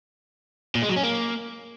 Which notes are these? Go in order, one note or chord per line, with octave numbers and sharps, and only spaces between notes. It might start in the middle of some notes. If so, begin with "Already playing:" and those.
A#2
G#3
F#3
C#4
A#3